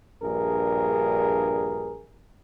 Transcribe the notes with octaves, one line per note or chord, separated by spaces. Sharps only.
A#1 G2 G#4 A#4